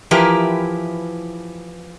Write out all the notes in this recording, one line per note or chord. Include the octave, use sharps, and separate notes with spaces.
E3 F3 E4 G4 A#4 B4